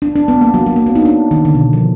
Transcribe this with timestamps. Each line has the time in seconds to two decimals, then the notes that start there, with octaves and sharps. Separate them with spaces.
0.02 D4
0.16 D4
0.28 B3
0.41 A#3
0.54 F#3
0.66 F#3
0.76 A#3
0.86 B3
0.95 D#4
1.05 D4
1.31 D#3
1.45 D3
1.55 B2
1.73 F3